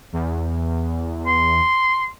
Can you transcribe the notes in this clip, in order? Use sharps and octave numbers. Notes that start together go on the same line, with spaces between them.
E2
C6